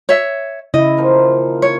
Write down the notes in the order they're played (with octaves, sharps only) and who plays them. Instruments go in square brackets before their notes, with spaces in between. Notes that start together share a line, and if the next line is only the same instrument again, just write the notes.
[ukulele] C#5 E5
[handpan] C#3 E4 [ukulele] D#5
[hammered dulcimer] D#3 F3 A#3
[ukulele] C#5